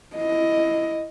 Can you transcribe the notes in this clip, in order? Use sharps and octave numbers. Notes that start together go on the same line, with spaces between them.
E4 D#5